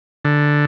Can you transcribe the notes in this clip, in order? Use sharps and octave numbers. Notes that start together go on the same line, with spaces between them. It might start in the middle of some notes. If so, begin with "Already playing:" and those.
D3